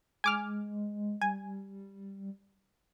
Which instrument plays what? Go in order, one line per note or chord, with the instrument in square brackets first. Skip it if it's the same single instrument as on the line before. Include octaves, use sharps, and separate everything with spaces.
[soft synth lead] G#3 [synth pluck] G#5 D6 F6
[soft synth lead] G3 [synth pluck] G#5